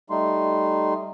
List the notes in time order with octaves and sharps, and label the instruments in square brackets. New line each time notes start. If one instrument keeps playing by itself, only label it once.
[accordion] G3 A3 D#4 C6